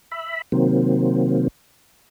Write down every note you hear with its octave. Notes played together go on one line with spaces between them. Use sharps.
E5 B5
C3 D#3 F#3 A#3 C4